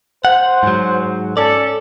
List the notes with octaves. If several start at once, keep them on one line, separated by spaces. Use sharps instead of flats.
C5 F#5
G#2 F#3
C#4 A4 D5